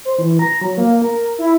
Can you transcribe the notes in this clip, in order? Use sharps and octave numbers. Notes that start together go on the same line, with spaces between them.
C5
E3
A#5
F#3
A#3
A#4
E4